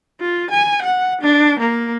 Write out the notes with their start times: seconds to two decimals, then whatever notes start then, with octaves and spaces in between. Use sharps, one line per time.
0.21 F4
0.51 G#5
0.82 F#5
1.21 D4
1.59 A#3